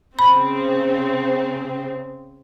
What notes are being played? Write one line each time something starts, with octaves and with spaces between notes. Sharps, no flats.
C#3 C4 B5